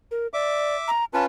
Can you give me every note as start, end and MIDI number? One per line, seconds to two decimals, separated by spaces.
0.11 0.27 70
0.34 0.76 74
0.34 0.91 76
0.34 0.91 86
0.88 1.05 82
1.14 1.26 61
1.14 1.26 65
1.14 1.26 71
1.14 1.24 81